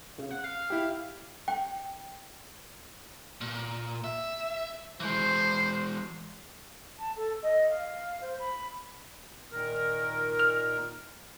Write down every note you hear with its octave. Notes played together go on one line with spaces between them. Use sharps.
C#3
F#5
F5
E4 G4
G5
A#2
E5
E3 G#3 C5
A5
A4
D#5
F5
C5
B5
A#2 D#3 A#4
F6